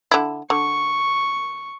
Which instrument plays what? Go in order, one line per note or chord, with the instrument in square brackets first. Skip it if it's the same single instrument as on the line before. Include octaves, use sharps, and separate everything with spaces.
[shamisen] D3 E4
[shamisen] D3 [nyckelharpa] C#6